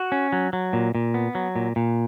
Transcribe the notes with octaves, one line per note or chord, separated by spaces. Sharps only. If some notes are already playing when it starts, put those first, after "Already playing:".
Already playing: F#4
C#4
F#3
F#3
A#2
A#2
B3
F#3
A#2
A#2